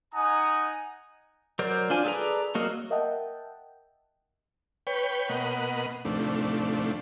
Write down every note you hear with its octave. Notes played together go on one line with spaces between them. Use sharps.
D#4 F#5 G#5 A#5 D#6
F#3 A#4 C5 D5
D4 F4 G#5
G#4 A4 B4 D5 A#5
F#3 A#3 F#4 A#4 D#5
A#4 D#5 E5 F#5 G5 A5
B4 C#5 G5
B2 A#3 D#5 F#5 B5
D#2 A2 C3 F3 A3 D4